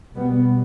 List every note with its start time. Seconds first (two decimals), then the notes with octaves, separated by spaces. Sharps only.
0.15 B2 G3 B3